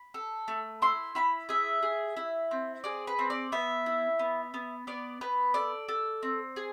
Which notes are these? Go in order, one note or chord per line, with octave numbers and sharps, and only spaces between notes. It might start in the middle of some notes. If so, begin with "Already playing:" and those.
Already playing: B5
A4
A3
E4 C6
E4 B5
G#4 E5
G#4
E4
C4
G#4 D5
B4
C4
D5
B3 E5
E4
B3
B3
B3 D5
B3 B4
A4 D5
A4
C4
G#4